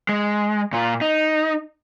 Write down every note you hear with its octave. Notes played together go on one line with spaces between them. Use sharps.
G#3
A#2 F4
D#4